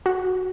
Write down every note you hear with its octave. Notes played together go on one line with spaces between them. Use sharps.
F#4